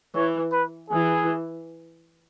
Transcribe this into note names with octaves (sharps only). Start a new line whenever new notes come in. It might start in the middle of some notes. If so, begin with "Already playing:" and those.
E3 C#5
B4
E3 G#4